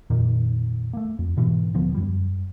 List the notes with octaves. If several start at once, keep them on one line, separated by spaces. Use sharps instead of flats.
F2 A#2 D#3
A3 A#3
F2
G#2 B2 E3
D#1 D3 F3 B3
F#2 G3